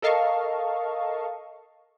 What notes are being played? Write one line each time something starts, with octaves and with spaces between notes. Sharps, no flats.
A4 A#4 D#5 F5 A5 C#6